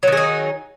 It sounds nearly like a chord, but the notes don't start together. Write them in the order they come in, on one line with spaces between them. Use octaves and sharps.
F#3 D#3 G#4 D#4